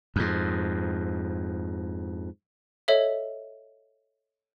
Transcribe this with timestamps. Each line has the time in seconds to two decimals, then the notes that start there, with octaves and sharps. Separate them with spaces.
0.16 F2 G#2
2.88 A4 C#5 D#5 E5